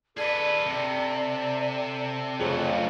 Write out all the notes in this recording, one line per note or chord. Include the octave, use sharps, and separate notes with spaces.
G#4 A4 B4 D5
C3
F2 C#3 F#3 A3